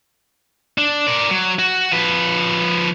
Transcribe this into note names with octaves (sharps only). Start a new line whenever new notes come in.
D4
A#4 D5
F#3
F#4
F3 B4